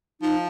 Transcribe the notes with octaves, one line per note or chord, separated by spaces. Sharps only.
F3 D#4